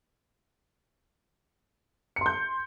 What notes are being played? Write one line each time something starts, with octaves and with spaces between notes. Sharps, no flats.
C6 G6 C#7